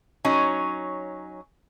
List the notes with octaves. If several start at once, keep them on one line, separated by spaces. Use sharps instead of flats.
F#3 C#4 D#4